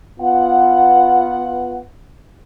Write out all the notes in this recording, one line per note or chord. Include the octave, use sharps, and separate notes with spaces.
B3 F4 F#5